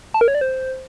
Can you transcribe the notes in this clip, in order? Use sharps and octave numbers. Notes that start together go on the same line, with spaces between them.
A5
A#4
C#5
D5
C5